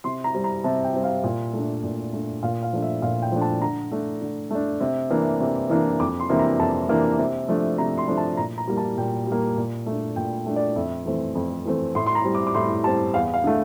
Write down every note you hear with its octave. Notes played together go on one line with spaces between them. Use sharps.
C3 C6
A#5
G3 C4
A#5
C3 A5
G5
G3 C4
F5
A#2
A3 D4
A#2
A3 D4
A#2 F5
F5
F3 A3 D4
E5
A#2 F5
G5
F3 A3 D4
A5
D3 A#5
A3 D4
D3
A3 D4
C3
E3 A#3 D4
C3
E3 A#3 D4
F2 D6
C6
C3 E3 A#3 D4
A#5
F2 A5
C3 E3 A#3 D4
C3
F3 A3 D4
C3 A#5
C6
F3 A3 D4
A5
A#2 A#5
A#5
G3 A#3
A5
A#2 G5
G3 A#3
A#2
A3 D4
A#2 G5
A3 D4
D5
F2 E5
E3 A3 C4
F2
E3 A3 C4
A2 C6
C6
A#5
G3 C4
D6
D6
A2 C6
G3 C4 A5
E2 F5
F5
D3 A3